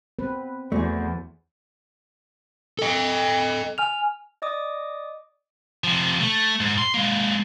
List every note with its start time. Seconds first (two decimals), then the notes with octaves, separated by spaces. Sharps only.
0.19 B3 C4 B4
0.72 E2 A3 B3 F#4 G#4 C5 D5
2.79 A4 D#5
3.78 G#5 F6 F7
4.42 D5 D#5 D6 D#6
5.84 C3 F3
6.20 A3
6.60 G#2
6.78 C6
6.94 G#3 A#3